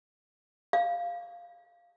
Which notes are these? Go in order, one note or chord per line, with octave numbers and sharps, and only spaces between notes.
F5